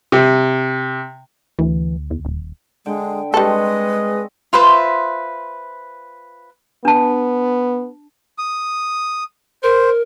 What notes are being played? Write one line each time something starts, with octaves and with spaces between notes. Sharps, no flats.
C3
D2 E3
E2
D#1
D3 G#3 G5
G3 G#3 C4 A4 B4 D#5 C6 C#6
F4 B4 C5 E5
B3 D4 A5
D#6
A#4 C5